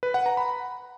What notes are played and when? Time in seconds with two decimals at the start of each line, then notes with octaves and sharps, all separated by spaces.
0.03 B4
0.14 F#5
0.26 A#5
0.37 B5